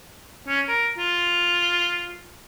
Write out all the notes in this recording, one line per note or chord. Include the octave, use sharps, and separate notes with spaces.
C#4
A#4
F4